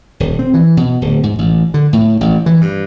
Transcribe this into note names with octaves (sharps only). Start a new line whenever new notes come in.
D#1
C4
E3
B2
D1
G#2
A1
D3
A2
A1
E3
G2